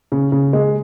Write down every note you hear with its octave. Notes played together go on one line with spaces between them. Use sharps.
C#3
C#3
G#3